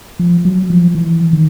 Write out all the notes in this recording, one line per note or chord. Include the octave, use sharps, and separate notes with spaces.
F3
F#3
F3
E3
D#3